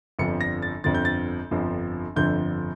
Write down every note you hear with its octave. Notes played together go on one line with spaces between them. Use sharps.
G1 F2 D3 F3 C#7
A#6
A6
G1 F2 D3 F3 A6
G6
A6
G1 F2 D3 F3
G1 F2 D3 F3 G6